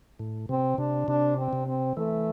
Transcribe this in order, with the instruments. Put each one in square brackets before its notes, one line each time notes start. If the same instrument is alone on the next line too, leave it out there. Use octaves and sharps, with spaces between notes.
[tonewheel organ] A2
[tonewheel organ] C3 [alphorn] C4
[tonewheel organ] C3 [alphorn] D4
[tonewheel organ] C3 [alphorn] D4
[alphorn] C4
[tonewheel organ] C3
[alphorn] C4
[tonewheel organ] E3 [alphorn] A3